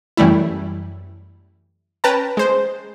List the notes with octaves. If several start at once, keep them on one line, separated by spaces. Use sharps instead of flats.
F#2 E3 G3 A3 E4
C#4 B4 G5 A5 A#5
G#3 C5